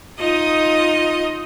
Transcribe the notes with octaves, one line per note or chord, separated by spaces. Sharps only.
D#4 F4 D#5 D#6